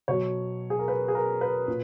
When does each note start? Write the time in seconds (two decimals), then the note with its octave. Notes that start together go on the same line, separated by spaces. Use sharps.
0.08 B2 F#3 C#5
0.70 G#4
0.79 A#4
0.88 B4
1.08 G#4
1.15 A#4
1.41 B4
1.68 A#2